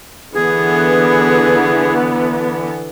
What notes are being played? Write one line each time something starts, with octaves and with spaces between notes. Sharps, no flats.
D3 E3 B3 G#4